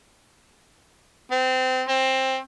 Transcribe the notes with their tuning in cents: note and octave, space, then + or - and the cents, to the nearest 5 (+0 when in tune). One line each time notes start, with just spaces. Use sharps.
C4 -25
C4 +15